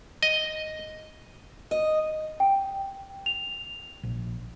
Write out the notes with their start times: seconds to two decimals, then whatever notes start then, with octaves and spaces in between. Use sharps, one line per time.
0.23 D#5
1.71 D#5
2.40 G5
3.26 F7
4.03 A#1